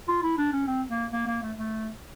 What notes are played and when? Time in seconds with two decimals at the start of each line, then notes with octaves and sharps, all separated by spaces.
0.08 F4
0.23 E4
0.38 D4
0.53 C#4
0.67 C4
0.91 A#3
1.13 A#3
1.27 A#3
1.42 A3
1.58 A3